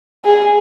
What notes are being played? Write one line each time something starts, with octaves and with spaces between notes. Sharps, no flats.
G#4